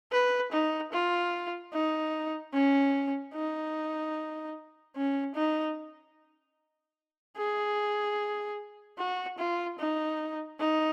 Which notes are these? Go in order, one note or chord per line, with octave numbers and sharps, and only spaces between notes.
B4
D#4
F4
D#4
C#4
D#4
C#4
D#4
G#4
F#4
F4
D#4
D#4